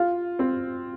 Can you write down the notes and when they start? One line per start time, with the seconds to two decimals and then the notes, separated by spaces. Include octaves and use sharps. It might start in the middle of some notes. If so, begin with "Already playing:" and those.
Already playing: F4
0.39 C4